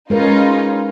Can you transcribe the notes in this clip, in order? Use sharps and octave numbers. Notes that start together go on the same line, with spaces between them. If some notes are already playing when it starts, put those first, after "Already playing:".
G#3 C#4 D#4 F4 A#4 B4